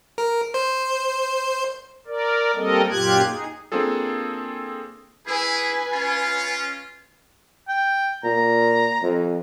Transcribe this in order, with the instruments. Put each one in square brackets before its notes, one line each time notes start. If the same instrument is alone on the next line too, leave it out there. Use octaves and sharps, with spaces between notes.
[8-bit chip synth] A#4
C5
[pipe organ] A#4 D5
G3 A#3 C4 A4 A#4 D#5
F#2 A#2 F4 G4 F#6 G#6
D#4 G#4
[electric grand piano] A#3 C4 D4 F4 G#4 A4
[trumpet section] E4 G#4 [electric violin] B4 G#5
[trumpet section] C#4 F4
[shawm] G5
[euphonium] A#2 [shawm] A#5
[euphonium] F2